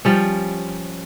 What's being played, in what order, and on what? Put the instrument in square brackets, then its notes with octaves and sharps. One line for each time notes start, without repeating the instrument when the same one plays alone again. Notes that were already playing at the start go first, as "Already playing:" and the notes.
[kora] F3 G3 C#4